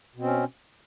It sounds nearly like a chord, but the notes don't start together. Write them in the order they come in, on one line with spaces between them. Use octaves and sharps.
B2 C4 C#4